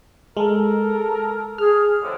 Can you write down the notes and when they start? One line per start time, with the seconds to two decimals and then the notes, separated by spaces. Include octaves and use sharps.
0.37 G#3 A4 A#4
1.58 G#4 F6
2.02 F2 A2 D3